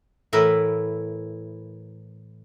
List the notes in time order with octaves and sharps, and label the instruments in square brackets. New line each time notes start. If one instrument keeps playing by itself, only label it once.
[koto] A2 E3 E4 A#4 B4